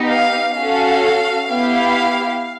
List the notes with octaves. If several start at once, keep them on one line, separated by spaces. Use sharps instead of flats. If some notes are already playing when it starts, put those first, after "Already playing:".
Already playing: B3 D#4 G4
F5
C#4 F#4 A4 F5
B3 E4 G4 F5